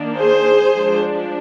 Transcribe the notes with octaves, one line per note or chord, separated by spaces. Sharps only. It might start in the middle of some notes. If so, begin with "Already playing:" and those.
Already playing: D#3 A#3 D4
G#4 C5
F3 G#3 D4